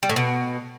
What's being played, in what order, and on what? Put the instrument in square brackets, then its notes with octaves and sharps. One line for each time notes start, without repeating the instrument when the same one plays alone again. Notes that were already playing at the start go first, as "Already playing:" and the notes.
[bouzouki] G3
A2
B2